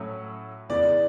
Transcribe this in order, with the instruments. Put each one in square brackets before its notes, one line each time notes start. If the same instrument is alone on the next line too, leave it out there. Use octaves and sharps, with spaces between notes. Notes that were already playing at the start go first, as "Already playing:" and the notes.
Already playing: [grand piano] A2 F#3 A3 C#4 F#4
[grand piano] E2 C#3 E3 G#3 B3 [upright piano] D5